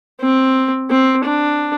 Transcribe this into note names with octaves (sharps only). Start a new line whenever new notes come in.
C4
C4
D4